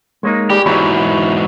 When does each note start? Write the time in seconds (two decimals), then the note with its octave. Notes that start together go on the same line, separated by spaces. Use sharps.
0.23 G#3 A#3 D#4 C#5
0.50 G3 G4 G#4 B5
0.66 E2 G#2 F#3 E4